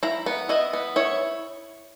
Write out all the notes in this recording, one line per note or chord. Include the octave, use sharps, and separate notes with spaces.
E4 A#5
B3
E4 D#5
B3
E4 C#5